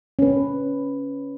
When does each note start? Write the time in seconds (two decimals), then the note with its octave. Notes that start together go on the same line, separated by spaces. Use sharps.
0.19 C#4 B4